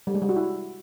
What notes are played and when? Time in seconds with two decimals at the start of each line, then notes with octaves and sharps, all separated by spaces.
0.07 G3
0.14 G#3
0.22 G3
0.29 F#4
0.36 E4